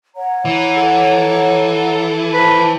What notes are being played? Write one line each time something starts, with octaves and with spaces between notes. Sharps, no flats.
C#5 F#5 A#5
E3
A4
B4 C5 A5